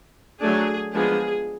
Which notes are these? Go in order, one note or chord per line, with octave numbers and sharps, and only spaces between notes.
F#3 A3 D4 G#4
F3 G#3 B3 D4 G#4